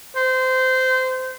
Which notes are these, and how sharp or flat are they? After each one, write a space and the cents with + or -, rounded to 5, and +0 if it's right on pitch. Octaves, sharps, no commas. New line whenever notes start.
C5 -20